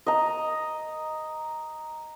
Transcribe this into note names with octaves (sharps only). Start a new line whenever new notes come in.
D#5 A#5